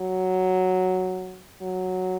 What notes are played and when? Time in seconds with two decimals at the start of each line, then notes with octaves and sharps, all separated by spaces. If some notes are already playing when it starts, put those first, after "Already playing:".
Already playing: F#3
1.61 F#3